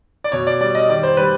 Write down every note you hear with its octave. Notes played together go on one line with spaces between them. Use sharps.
D5
B2 C#5
D5
G3 D5
D#5
D#3 D5
C5
G3 B4